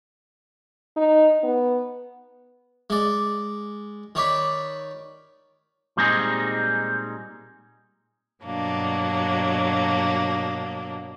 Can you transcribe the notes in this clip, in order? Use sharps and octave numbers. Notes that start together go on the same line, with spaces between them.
D#4
B3
G#3 D5
D#3 C#5 D5 B5
A#2 G3 G#3 C4 D#4 G#4
G2 B2 F#3 A#3 D4